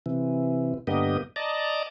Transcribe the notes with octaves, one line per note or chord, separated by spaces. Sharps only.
C3 E3
G2 D3 A#3 B3 G4 D#5
D5 D#5 A5 A#5